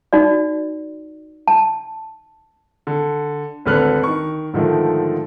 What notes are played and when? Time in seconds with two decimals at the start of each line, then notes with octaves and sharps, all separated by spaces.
0.13 D#4 F#4 D5
1.48 A5
2.87 D3
3.66 G#1 D2 D3 B4 F6 F#6
4.03 D#3 C#6
4.53 G#2 D3 D#3 F3 A3